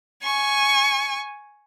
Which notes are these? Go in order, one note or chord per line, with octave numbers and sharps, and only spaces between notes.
G#5 C#6